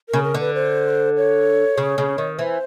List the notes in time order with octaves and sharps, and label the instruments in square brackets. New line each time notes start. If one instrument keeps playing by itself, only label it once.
[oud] C#3 [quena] A#4
[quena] A#4
[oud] D3
[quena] B4
C5
C#5
[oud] C#3
C#3
D#3
[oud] E3 [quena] C5